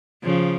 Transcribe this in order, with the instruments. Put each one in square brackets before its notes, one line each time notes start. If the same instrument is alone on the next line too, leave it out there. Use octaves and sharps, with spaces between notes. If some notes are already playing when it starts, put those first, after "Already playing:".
[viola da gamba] C#3 F3